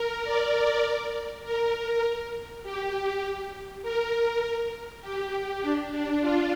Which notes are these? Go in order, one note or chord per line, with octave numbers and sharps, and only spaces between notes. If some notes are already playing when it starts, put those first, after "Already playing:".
Already playing: A#4
D5
A#4
G4
A#4
G4
D4
D4
F4